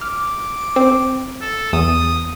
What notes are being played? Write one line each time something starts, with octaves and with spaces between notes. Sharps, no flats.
D6 F6
C4
A4
E2 D#6